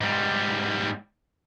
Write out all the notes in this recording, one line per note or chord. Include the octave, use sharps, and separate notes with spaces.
G#2 G3